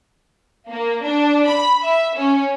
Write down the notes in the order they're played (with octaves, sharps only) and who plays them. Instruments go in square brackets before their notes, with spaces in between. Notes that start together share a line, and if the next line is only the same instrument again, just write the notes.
[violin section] A#3
D4
B5
E5
C#4